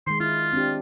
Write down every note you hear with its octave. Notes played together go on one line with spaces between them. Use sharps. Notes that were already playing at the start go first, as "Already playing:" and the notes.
D#3 G#3 C6
E4 F4
C4 D4 G4